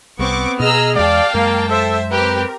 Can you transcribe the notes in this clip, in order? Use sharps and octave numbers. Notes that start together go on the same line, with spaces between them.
C2 G3 B3 C4 C#6 D6
B2 G#4 D#5 A#5 E6 F6
E2 G#3 D5 F5 G5 A5
F#2 G#3 A#3
A4 C5 E5
C4 G4 A#4 B4